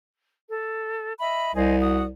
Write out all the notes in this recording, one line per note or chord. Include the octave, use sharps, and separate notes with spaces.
A4
D#5 E5 B5
C2 G#4 C5 D#5
F#4 D#6